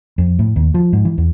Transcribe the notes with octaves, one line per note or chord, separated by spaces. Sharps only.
F2
A2
D#2
F3
G#2
E3
E2